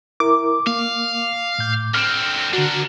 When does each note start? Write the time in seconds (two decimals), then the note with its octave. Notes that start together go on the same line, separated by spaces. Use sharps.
0.20 E4 A#4 D6
0.67 A#3 F5
1.59 A2 G6
1.94 D3 C4 F6
2.53 D3 D4 F#4 A#4